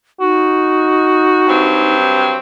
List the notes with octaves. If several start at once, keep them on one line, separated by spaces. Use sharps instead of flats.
D#4 F#4
G2 F#3 C4